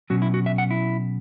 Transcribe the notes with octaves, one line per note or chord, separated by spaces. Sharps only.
B2 F#3 C#4 F#4
E4
F#4
E5
F#5
E4